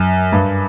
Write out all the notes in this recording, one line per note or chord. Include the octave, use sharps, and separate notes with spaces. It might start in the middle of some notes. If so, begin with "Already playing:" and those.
Already playing: F#2
G2